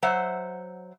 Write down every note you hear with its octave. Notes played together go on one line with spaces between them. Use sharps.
F#3 C5 E5 F#5